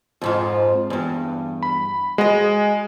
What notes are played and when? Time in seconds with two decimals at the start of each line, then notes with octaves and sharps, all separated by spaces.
0.21 F2 G#2 F3
0.90 E2 G2
1.63 B5
2.18 G#3 F#4 D#5